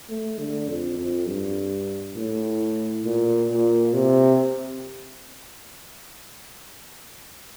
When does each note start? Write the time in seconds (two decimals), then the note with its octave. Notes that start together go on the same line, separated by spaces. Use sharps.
0.10 A3
0.39 D3
0.69 F2
0.98 F2
1.28 G2
2.16 A2
3.05 A#2
3.50 A#2
3.93 C3